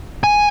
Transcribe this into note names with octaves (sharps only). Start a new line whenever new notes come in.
G#5